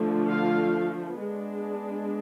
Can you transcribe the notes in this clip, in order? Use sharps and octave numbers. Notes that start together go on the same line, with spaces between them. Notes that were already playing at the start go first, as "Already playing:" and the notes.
Already playing: D3 F3 A3
F4 F5
G#3 B3 D4